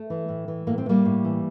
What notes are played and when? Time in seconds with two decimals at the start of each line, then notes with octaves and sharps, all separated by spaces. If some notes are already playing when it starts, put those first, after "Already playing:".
Already playing: A3
0.10 E3
0.28 A2
0.48 E3
0.67 A2 A#3
0.78 C4
0.86 E3
0.89 G3 A#3
1.05 A2
1.24 E3